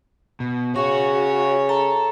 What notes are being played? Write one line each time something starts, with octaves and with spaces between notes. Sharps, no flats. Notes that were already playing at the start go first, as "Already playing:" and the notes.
B2
C#3 F#4 C#5 C#6
A4 A#5